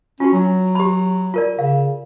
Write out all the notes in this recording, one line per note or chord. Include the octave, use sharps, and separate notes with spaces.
C#4 F4 F#4
F#3
G4 B5
F4 A#4 D5
C#3 F5